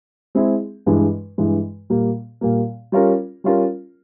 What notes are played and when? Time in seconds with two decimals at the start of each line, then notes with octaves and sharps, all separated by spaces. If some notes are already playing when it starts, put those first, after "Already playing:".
0.35 G#3 C4 E4 G#4
0.86 G2 E3 G#3
1.38 G2 E3 G#3
1.90 A#2 G3 A#3
2.41 A#2 G3 A#3
2.92 G3 C#4 F4 A#4
3.44 G3 C#4 F4 A#4